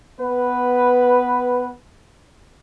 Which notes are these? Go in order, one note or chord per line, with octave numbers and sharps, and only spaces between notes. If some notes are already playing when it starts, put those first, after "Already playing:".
B3 B4